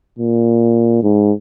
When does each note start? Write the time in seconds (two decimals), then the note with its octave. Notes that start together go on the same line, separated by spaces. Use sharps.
0.18 A#2
1.03 G#2